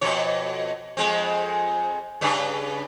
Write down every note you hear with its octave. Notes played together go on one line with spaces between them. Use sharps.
F2 B2 C#5
F2 G#3 C4
G2 C#3 B4